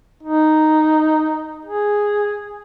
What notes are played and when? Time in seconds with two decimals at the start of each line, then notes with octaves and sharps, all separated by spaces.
0.23 D#4
1.65 G#4